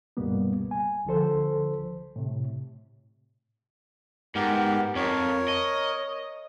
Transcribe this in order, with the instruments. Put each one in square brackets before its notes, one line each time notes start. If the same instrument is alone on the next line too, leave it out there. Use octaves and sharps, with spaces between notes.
[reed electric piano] C#2 G2 B2 G3 A#3 B3
G#5
C#2 D3 F3 A4 C5
A2 C3
[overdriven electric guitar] G#2 [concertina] B3 G4 A#4
[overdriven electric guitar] F2 [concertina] A#4 C#5
[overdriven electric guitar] D#5